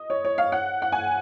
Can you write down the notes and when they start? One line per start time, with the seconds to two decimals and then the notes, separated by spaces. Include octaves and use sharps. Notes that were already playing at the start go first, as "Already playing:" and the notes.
Already playing: D#5
0.10 C#5
0.25 C#5
0.38 F5
0.52 F#5
0.82 F#5
0.92 G#5